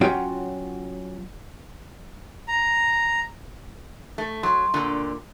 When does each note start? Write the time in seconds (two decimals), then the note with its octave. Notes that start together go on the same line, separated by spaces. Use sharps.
0.01 F#3 C#4 F4 F#4 G5
2.48 A#5
4.18 A3
4.43 F#3 C6 C#6
4.74 A#2 D3